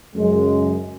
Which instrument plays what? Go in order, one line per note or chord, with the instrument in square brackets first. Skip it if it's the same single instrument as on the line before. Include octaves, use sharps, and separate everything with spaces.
[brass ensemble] F#2 C#3 G#3